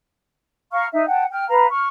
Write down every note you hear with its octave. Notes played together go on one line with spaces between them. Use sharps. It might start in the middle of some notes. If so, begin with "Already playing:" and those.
F5 A#5 C#6 F6
D#4 E5
F#5 G5 A5
G5 F6
B4 F5 A#5
C#6 F6